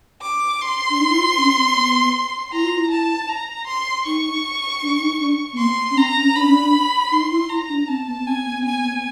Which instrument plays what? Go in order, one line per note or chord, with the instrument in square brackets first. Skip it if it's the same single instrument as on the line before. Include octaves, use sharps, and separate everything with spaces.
[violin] D6
C6
[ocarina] D4
D#4
E4
F4
C#4
C4
B3
[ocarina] E4 [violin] A#5
[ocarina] F4
E4
[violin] A5
A#5
C6
[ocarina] D#4 [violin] C#6
[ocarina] D4
D#4
D4
B3
[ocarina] A#3 [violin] C6
[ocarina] C#4
[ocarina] C4 [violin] A#5
[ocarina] C#4
[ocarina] D4 [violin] B5
[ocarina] C#4
D4
[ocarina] D#4 [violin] C6
[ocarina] E4
[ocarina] E4 [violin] A#5
[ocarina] D4
[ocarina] C4 [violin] A5
[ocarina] B3
[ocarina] C4 [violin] G#5
[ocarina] B3
C4
[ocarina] B3 [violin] G#5
[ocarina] B3
B3